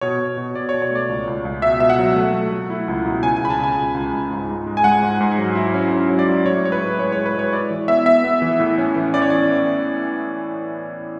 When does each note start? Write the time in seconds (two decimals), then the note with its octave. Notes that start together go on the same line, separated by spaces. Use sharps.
0.01 B2 C#5
0.20 B2
0.37 B2
0.55 B2 D5
0.69 C#5
0.74 B2
0.82 C#5
0.91 A3 D5
1.09 C#2
1.27 C#2
1.45 C#2
1.62 B2 E5
1.80 B2 E5
1.90 F#5
1.99 F#3
2.16 A3
2.34 A3
2.52 A3
2.70 E4
2.88 C#2
3.06 B2
3.23 C#3 G#5
3.37 G#5
3.41 C#2 B5
3.50 A5
3.59 C#3 G#5
3.77 C#2
3.95 C#2
4.13 C#2
4.30 G#2
4.49 G#2
4.66 G#3
4.77 G#5
4.84 G#3 F#5
5.03 G#2
5.20 G#2
5.38 F#3
5.55 E4
5.74 C#4
5.91 C#4
6.09 F#3
6.19 D5
6.27 E4
6.45 A2 C#5
6.63 G#3 C#5
6.72 B4
6.81 A2
6.99 G#3 C#5
7.12 C#5
7.17 G#3
7.26 B4
7.34 G#3 C#5
7.53 E4 D5
7.71 E3
7.88 B3 E5
8.06 B3 E5
8.24 B3
8.42 E3
8.60 A2
8.78 C#4
8.95 E3
9.14 C#4 D5
9.22 C#5
9.30 E3 D5